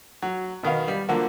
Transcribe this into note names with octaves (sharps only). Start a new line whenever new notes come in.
F#3
B2 D#3 B3 F5
G3
D3 F3 F#3 A#3